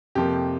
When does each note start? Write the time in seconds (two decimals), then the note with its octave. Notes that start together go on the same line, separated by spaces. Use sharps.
0.15 F2 C3 F3 A#3 G4